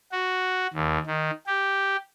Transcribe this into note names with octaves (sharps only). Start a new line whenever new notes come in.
F#4
D#2
D#3
G4